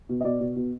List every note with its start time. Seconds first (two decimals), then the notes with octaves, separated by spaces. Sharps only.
0.09 B2
0.21 D#5
0.24 B2 D5
0.41 B2
0.56 B2